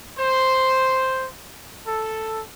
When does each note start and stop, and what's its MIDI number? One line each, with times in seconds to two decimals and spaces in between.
0.18 1.26 72
1.87 2.41 69